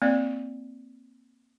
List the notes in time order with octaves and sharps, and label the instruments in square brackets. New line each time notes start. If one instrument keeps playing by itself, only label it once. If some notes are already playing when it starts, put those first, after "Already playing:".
[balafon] A#3 C4 D5